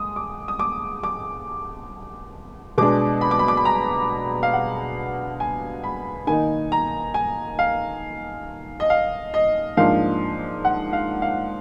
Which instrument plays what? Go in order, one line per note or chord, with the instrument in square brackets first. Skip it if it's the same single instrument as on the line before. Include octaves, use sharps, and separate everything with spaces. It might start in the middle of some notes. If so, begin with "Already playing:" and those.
Already playing: [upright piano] G#3 D#6
D6
D#6
D6
D6
B2 G#3 D4 D6
B5
D6
B5
D6
B5
A#5
F5
F#5
G#5
B5
D#3 A#3 D#4 G#5
A#5
G#5
F5
D#5
F5
D#5
G#2 F3 A#3 D4 F5
F#5
F5
F5